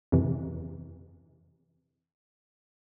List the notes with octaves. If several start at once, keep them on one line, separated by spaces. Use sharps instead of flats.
F2 C3 E3